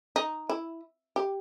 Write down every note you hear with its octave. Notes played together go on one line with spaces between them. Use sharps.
D#4
E4
G4